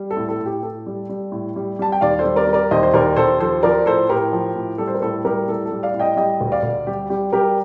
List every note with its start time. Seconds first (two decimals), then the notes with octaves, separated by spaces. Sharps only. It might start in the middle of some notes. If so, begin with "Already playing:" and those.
Already playing: G3
0.11 A4
0.17 A2
0.29 A4
0.40 A2
0.46 G4
0.63 A2 A4
0.86 G3
1.09 G3
1.32 A2
1.56 G3
1.79 G3 A5
1.92 G5
2.01 D#2 D5 F5
2.19 A4 C5
2.25 G3
2.36 A#4 D5
2.47 G3
2.53 A#4 D5
2.71 D#2 C5 D#5
2.83 C5
2.94 D#2 A#4 D5
3.16 D#2 A4 C5
3.40 F3 A4 C5
3.63 F3 A#4 D5
3.86 A2 A4 C5
4.09 A2 G4 A#4
4.33 F3
4.55 A2
4.78 G3 A4
4.88 C5
4.94 A#4
5.02 A2 A4
5.25 G3 G4 A#4
5.48 A2 A4
5.65 A4
5.72 G3
5.83 D5 F5
5.94 A2
5.99 D#5 G5
6.17 G3 D#5 G5
6.41 D2
6.52 D5 F5
6.63 D2
6.87 G3 G4
7.10 G3 G4
7.32 G3 G4 A#4